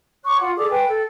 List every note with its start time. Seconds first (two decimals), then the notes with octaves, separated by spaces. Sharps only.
0.25 C#5 C#6 D6 F#6
0.40 F4 F#5
0.56 G#4 A4 D5 D6
0.69 B4 G5 G#5
0.89 A4